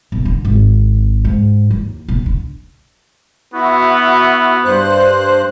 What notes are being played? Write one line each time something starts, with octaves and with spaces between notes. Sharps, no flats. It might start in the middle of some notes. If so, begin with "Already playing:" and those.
B1
D3
G#1
G#2
D#2
B2
D3
B3 E4 F#4
G2 C5 F#6